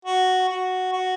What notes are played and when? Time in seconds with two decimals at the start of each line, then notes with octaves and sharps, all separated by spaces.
0.05 F#4
0.49 F#4
0.93 F#4